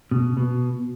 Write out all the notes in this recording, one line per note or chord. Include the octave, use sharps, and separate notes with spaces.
B2
B2